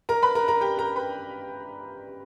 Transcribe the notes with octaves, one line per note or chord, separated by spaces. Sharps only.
A#4 A#5
B4 B5
A#4 A#5
A#4 A#5
G4 G5
A#4 A#5
B4 B5